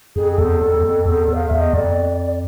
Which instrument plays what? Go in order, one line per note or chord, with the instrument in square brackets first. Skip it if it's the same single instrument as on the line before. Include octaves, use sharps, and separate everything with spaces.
[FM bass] F2 [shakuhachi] G#4
[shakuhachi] G#4
[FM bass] E2 [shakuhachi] A4
[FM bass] F2
E2
F2
E2
E2
[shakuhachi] F5
E5
[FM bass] E2
[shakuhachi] D#5
[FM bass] F2 [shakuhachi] D5